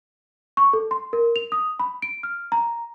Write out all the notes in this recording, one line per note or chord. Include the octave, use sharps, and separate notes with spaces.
C#6
A4
C6
A#4
F7
D#6
B5
D7
F6
A#5